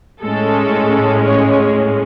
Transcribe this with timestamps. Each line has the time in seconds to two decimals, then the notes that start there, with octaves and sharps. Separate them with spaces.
0.22 A2 G#3 C#4 A4
1.24 C#5